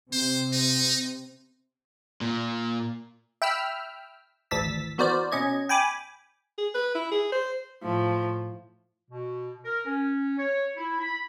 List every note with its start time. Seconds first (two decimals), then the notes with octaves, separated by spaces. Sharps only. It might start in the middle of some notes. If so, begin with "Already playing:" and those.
0.12 C3 C4 C5
0.53 D#4
2.21 A#2
3.42 E5 G5 B5 E6 F6
4.51 G#1 D2 E3 E6 A6 B6
4.98 E3 B3 F#4 A#4 C5 D5
5.32 B2 C#4 D#5 G#6
5.69 G5 G#5 B5 D6
6.58 G#4
6.75 B4
6.95 E4
7.11 G#4
7.32 C5
7.83 A2 F3
9.10 B2
9.65 A#4
9.86 C#4
10.37 C#5
10.76 E4
11.00 B5